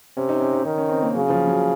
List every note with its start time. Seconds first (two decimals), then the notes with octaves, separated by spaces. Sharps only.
0.17 C3 C#4
0.29 D#4
0.41 C#4
0.53 D#4
0.65 D#3 C#4
0.78 C#4
0.89 C4
1.02 A#3
1.15 C#3 F#3
1.30 F3
1.47 F#3